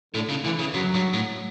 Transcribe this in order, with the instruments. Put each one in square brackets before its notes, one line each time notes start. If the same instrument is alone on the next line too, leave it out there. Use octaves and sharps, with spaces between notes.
[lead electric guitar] A2 [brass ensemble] D3
[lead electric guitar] C#3
[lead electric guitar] D3 [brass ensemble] E3
[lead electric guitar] C#3
[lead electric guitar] F#2 [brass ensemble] F#3
[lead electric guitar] G2
A2